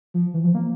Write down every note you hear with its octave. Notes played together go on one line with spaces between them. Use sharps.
F3
E3
F3
A#3